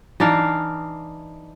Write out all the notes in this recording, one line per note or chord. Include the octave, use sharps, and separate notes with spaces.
E3 D4 D#4 F5